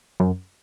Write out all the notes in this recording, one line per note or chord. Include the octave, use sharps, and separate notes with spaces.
F#2